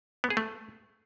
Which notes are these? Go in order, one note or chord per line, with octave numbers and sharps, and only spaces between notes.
B3
G#4
A3